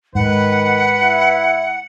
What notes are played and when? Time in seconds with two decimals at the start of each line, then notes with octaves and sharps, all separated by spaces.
0.15 G#2 D#3 B4 F#5
1.01 E4